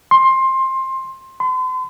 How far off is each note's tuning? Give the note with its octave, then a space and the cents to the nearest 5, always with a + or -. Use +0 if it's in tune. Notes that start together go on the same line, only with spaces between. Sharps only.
C6 +20
C6 -40